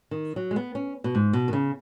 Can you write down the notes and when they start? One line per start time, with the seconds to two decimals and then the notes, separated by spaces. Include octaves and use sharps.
0.11 D#3
0.36 F#3
0.51 G#3
0.56 B3
0.75 C#4
1.04 B2
1.15 G#2
1.33 B2
1.48 D#3
1.53 C#3